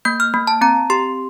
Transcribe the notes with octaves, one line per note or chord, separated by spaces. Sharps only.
A#3 G6
F6
A#3
A5
C4 A#5
G4 C6